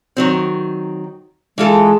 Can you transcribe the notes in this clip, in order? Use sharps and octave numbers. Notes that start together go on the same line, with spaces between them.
D#3 F#3 C4
E3 G#3 F4 A4